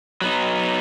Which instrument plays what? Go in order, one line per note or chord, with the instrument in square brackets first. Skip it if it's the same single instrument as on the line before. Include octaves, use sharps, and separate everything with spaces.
[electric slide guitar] F#3 B3 D#4